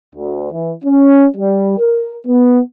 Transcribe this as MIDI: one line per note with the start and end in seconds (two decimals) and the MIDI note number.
0.15 0.48 38
0.52 0.72 52
0.85 1.26 61
1.36 1.76 55
1.79 2.15 70
2.27 2.61 59